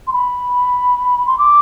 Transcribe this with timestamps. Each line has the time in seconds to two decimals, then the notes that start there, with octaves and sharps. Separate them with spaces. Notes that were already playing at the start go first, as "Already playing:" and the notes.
0.07 C6
0.13 B5
1.27 C6
1.38 D6